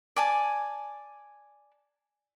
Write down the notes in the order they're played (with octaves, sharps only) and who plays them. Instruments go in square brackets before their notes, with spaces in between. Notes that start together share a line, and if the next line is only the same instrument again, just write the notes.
[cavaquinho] D5 G#5 A5